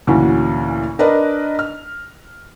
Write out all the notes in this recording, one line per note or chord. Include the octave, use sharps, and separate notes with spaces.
D2 A#2 E3 C#4 F#4
D4 A#4 B4 D5 D#5
F6